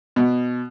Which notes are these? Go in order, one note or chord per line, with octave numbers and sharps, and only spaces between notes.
B2